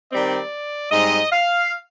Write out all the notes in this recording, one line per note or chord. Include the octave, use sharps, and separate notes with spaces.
D#3 G3 C4 D5
G#2 G3 C4 D#5
F5